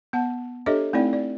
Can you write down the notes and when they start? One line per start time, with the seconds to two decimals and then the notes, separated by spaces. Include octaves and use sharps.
0.13 B3 F#5 A5
0.66 D4 G4 A4 C#5 D#5 E5
0.93 A3 C4 D#4 E4 D5 G5
1.13 D5